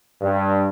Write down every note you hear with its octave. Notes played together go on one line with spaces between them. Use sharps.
G2